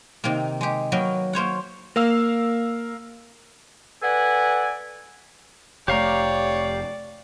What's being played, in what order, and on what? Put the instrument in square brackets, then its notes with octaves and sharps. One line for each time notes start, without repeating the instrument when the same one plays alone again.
[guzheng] C3 D#3 A#3
G#3 G4
F#3 A#3 B3 B4 F5 G5
A#3 C5 C#5 F#5
[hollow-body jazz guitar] A#3 [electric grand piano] A#4 F5 E6
[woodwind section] A4 B4 D5 F#5 G#5
[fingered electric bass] F1 A3 [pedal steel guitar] G4 F5 A#5 [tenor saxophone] C#5 [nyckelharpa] D5